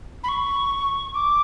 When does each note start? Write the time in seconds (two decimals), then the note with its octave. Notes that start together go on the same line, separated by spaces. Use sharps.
0.23 B5
0.28 C#6
1.14 D6